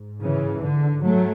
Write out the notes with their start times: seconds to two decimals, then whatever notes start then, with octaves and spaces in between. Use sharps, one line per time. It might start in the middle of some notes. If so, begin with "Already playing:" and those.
Already playing: G#2
0.21 C#3 E3
0.63 D3
1.03 F#3 A3